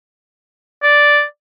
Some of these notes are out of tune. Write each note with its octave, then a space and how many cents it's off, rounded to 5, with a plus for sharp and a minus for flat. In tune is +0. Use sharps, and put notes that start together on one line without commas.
D5 -5